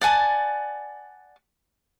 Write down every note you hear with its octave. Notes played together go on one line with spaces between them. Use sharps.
D5 F#5 G#5 A5